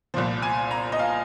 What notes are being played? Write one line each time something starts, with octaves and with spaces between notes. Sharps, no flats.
C2 A#2 F3 C5
G#5
A#5
D#5
F5